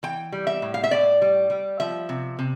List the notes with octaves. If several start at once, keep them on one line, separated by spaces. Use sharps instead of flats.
E3 G5
G3
E5
A2
F5
E5
A2 D5
G3
G3
F3 E5
C3
C3